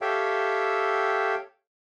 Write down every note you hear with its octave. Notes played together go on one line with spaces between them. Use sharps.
G4 A4 C#5 E5 F5 G5